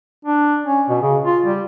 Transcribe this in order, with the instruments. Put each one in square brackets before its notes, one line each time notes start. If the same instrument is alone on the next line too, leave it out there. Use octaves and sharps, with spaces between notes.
[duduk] D4
C#4
B2
C#3
F4
G3